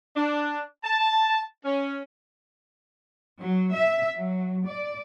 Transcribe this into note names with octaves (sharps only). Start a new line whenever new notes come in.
D4
A5
C#4
F#3
E5
F#3
D5